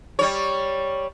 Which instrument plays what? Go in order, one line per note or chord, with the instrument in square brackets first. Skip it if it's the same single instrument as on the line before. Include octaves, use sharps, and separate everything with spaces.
[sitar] G3 C#5